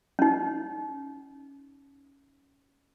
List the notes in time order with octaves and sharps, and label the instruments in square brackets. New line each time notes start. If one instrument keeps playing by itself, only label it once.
[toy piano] C#4 D#4